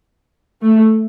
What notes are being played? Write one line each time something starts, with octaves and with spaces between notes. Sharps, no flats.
A3